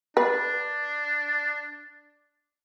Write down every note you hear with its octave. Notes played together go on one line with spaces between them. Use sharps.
D4 B4